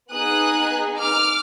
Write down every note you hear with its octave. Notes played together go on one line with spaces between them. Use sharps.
B3 D#4 G#4 D#6 F#6
D6 F6